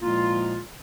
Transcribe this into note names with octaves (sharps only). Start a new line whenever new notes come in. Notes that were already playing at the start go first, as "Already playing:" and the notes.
A#2 F3 G#3 A#3 E4 F4